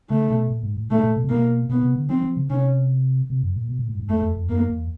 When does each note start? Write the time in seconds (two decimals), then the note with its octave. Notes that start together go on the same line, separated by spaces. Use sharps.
0.10 C#3 A3
0.30 B2
0.50 A#2
0.63 G#2
0.77 A2
0.90 A#2 A3
1.03 A#2
1.17 B2
1.24 C3
1.29 B2 A#3
1.69 B2 B3
1.82 C3
1.96 D3
2.09 F3 C4
2.23 F3
2.37 C#3
2.50 C3 C#4
3.30 C3
3.43 F#2
3.56 A#2
3.69 B2
3.79 A#2
3.89 A2
3.95 G2
4.00 G#2
4.09 E2 A3
4.22 F2
4.36 F2
4.49 F#2 A#3
4.69 E2